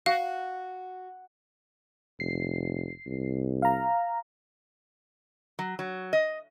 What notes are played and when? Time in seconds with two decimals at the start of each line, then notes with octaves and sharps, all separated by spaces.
0.06 F#4 F5
2.20 F1 C7
3.06 C2
3.62 F5 A#5
5.59 F#3
5.79 F#3
6.13 D#5